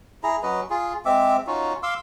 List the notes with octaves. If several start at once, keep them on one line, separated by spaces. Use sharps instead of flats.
E4 G#4 A#5
F#3 C#4 B4 D#5
F4 G#4
G#3 C4 E5 D6
C#4 D#4 F4 F#4
F5 C6 D6 E6